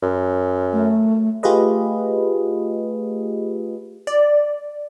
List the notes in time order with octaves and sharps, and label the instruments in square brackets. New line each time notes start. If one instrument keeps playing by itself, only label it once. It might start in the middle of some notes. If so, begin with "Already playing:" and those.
[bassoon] F#2
[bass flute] A3
[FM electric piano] A3 F4 G4 G#4 B4 D#5
[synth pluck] D5